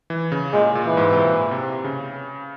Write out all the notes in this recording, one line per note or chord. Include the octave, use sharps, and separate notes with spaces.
E3
C#3
A#2 G#3
A#2
E3
G#2
C3
A#2
C3
C#3